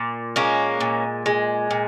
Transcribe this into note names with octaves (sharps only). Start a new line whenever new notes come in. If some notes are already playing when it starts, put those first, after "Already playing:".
Already playing: A#2
G#3 A#3 C#4
A#2
G#3
A#2